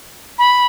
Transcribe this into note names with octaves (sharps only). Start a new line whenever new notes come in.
B5